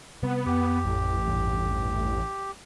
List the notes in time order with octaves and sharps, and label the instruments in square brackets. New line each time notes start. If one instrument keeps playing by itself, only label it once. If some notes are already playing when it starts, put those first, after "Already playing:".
[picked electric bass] C3 G3 C4 [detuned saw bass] B3
[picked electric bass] F2 [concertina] G4
[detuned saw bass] A1
[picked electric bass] A#1 E2 G2